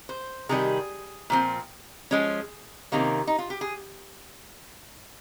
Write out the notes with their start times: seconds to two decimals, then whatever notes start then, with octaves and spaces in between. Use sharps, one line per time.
0.09 C5
0.49 C3 D#3 G3 G#4
1.30 A#2 F3 C4
2.11 F3 G#3 C#4
2.92 C3 D#3 A#3 C#4
3.27 D#4
3.38 F4
3.50 G4
3.61 G#4